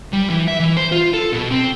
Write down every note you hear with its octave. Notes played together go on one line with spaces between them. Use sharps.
G3
E3
E5
E3
C5
F4
A4
B2
C4